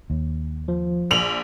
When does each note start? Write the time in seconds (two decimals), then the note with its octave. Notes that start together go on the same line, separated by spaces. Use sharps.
0.10 D#2
0.68 F3
1.11 A#1 F7 F#7